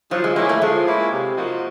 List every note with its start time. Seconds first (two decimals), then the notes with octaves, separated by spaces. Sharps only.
0.11 F3 F#3
0.24 G#3
0.36 G#3 A#3 C#4 E4
0.49 A3
0.62 F3 G#3
0.87 A#3 C#4 E4
1.12 C3
1.37 F3 A#3 D#4 F#4